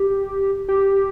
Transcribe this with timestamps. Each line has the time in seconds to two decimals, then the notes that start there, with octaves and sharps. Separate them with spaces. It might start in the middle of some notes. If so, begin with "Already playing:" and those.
Already playing: G4
0.68 G4